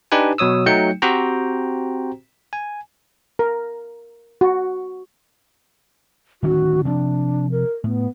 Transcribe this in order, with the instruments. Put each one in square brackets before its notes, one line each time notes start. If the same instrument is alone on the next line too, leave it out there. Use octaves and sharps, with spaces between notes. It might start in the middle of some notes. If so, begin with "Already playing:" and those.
[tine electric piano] D4 D#4 G4 B4 G#5
B2 F#3 C#5 D#6 E6
F#3 A3 D#4 G5 G6 C#7
C4 F#4 G4 C5 G5 A#5
G#5
[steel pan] A#4
F#4
[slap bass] D1 D#3 C#4 [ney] F#4
[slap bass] C3 F3 [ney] D4
[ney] A#4
[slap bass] A2 [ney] B3